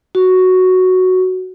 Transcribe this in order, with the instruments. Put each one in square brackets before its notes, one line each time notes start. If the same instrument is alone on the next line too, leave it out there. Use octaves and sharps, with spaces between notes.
[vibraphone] F#4